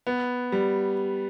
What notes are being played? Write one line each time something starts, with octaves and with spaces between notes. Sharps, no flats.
B3
G3